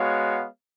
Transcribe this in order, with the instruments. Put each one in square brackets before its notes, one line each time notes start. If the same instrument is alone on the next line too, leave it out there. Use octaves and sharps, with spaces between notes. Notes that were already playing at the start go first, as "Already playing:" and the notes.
Already playing: [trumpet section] G#3 B3 F#4 C#5 F5